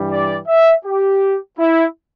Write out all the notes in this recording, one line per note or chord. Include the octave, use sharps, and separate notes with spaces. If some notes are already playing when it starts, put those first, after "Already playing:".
Already playing: G2 E3 G3
D5
E5
G4
E4